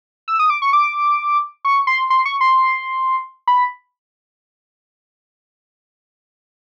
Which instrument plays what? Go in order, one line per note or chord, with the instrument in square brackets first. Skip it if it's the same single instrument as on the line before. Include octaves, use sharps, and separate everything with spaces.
[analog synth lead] E6
D#6
D6
C#6
D6
C#6
C6
C6
C#6
C6
B5